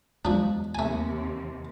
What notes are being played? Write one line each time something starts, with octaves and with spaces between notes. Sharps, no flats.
E2 F3 G#3 D4
D#2 C3 A3 G#5